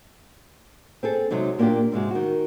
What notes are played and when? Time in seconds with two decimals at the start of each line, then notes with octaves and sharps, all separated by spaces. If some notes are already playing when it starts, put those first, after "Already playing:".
1.03 C4 G#4 A4
1.31 C3 F#3 G#3 D#4
1.59 A#2 A#3 B3 D4 F4 G4
1.92 G#2 C3 G#3 F#4
2.11 D#3 F#4